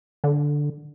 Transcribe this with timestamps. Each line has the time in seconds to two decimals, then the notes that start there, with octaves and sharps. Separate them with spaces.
0.24 D3